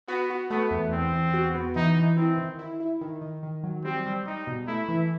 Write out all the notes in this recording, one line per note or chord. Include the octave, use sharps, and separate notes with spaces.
B3 F#4
F#4
A3 B3
E2
E2 C4
E2
F#4
B3
E3 D#4
E3
C4 E4
D#3
E4
E4
D#3
D#3
D#3
F#3
G3 C4
G3
G3 D#4
B2
A3 E4
E3